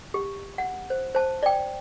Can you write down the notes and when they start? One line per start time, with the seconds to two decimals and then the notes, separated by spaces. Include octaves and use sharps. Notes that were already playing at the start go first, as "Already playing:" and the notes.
0.14 G4
0.58 F#5
0.90 C5
1.15 C5 A5
1.43 D5 G5